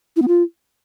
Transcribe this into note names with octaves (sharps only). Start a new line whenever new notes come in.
E4
B3
F4